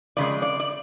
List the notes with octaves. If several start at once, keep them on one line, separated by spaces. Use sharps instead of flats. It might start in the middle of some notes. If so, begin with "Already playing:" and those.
F2 C#3 G#3 D5
D5
D5